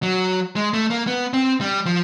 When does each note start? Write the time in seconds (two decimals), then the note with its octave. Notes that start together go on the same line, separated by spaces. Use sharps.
0.03 F#3
0.56 G#3
0.73 A3
0.90 A#3
1.07 B3
1.33 C4
1.61 G3
1.86 F3